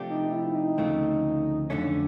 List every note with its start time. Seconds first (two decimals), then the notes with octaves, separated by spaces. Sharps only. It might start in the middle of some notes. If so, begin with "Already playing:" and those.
Already playing: C3 F3 A3 D4 G4
0.10 D#4
0.33 E4
0.55 D#4
0.78 D2 C#3 F3 A3 C4
1.70 F2 D3 F#3 A3 C#4 D4